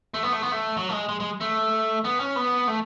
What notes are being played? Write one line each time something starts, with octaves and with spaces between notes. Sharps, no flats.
A3
B3
A3
B3
A3
F#3
A3
G#3
G#3
G#3
A3
B3
C#4
B3
A3